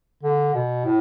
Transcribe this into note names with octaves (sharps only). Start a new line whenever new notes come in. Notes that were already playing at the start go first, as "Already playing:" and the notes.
D3
B2
A2